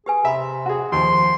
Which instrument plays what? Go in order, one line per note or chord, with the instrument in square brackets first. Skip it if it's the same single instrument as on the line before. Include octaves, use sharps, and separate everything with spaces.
[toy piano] G4 B4 G#5 [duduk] G#4
[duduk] C3 [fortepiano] E5 [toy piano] A#5 B5
[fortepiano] F#4 G#4
[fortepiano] D#2 [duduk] F3 [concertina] C6